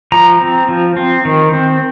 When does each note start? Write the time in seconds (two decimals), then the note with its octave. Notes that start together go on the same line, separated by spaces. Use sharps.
0.12 F3 A#5
0.41 C4
0.69 F3
0.97 C4
1.25 D#3
1.53 C4